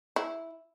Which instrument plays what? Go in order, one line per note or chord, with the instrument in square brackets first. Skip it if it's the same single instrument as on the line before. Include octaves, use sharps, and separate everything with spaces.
[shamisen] E4